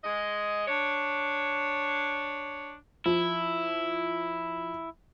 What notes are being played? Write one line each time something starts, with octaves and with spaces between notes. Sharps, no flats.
G#3 D#5
D4 C#5
F3 E4